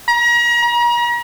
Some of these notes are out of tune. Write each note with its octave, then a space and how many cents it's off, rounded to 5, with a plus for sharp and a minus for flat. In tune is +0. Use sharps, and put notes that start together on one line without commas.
A#5 +35
A#5 +40